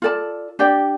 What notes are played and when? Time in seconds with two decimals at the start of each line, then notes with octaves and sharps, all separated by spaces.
0.02 F4 A4 D5 A5
0.59 D4 G4 D5 G5